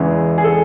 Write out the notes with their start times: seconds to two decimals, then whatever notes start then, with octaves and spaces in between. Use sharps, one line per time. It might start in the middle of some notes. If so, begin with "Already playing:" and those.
Already playing: E2 C#3 E3 G#3 G#4
0.38 G#4
0.44 A4